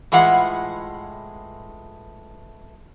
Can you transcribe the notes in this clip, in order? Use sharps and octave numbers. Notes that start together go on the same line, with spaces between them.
A2 E3 G#3 F4 F#5